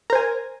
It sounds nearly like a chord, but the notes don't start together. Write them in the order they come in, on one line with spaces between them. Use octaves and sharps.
A#4 C5 G#5